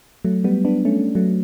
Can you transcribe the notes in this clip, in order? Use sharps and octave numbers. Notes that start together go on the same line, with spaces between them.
F#3 A3
G3 B3
B3 D4
A3 C#4
F#3 A3